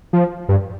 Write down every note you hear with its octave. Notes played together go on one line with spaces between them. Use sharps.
F3
G2